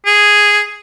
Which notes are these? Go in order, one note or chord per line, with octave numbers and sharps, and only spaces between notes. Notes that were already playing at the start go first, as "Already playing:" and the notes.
G#4